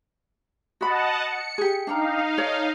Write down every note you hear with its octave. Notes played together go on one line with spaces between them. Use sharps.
F#4 D#5 F#5 A5 B5
C#7
G4 G#4
D4 D#4 F5 G5 A#5
A4 C#5 D5